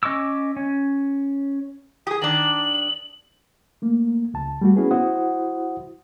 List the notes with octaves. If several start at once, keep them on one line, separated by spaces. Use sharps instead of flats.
C#4 D#5 C#6 D6 E6
C#4
G4 G#4 D#6
D#3 D4 F#7
A3 A#3
C#2 A5
G3 A3 F#4
B3 C#4 E4 F#4 G#4 B4
E4 F#4 C5 F#5 D#6